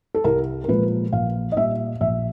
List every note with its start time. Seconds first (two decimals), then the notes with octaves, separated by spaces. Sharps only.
0.15 A4
0.24 C2 A#4
0.64 A#4
0.68 A#2 F3 G#3 B4
1.13 A#1 F5
1.52 D#5
1.56 A#2 G3 E5
2.00 A#1 E5